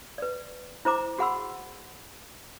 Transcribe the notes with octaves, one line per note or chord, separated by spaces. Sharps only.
B4 D5
E4 C5 A#5 D6
F#4 G#4 F#5 B5 C6 E6